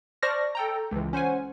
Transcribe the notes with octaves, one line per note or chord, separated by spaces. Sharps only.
C5 D5 A5 C#6 F6 A#6
A4 G5 A#5
C#2 E3
C#4 C5 F#5 G#5